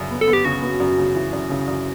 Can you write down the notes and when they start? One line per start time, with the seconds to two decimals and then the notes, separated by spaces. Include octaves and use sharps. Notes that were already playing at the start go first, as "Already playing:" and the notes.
Already playing: F#2 C#3
0.11 B3
0.21 A4
0.28 B3
0.33 G4
0.45 C#3 F#4
0.62 B3
0.80 F#2
0.98 C#3
1.15 E3
1.33 F#2
1.50 C#3
1.68 F#2